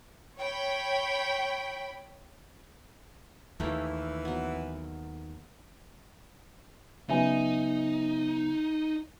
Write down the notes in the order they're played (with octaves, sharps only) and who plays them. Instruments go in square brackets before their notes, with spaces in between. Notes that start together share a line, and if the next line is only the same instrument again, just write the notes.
[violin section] C#5 G5 B5
[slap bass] D#2 [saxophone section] E3 [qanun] A3 A#3 G5
[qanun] F#3 B3
[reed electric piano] C#3 F#3 B3 [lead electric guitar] D#4 [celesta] E5 G#5